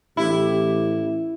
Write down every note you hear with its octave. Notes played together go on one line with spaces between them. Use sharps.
A1 E4 G4